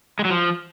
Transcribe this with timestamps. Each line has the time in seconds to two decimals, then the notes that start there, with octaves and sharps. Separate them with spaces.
0.19 G#3
0.25 F#3
0.30 F3